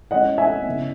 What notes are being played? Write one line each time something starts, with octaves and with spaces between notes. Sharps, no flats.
E3 G#3 C#4 D#5 F#5
E5 G#5
C#3 E3 B3